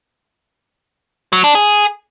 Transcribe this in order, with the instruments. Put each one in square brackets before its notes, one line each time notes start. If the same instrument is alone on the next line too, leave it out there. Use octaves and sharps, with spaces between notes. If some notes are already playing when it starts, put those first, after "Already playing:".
[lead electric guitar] F#3
D4
G#4